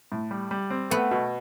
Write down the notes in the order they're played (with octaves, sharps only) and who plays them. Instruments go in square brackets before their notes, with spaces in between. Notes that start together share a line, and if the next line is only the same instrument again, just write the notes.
[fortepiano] A2
G3
G3
C4
[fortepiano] A3 [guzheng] B3
[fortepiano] B2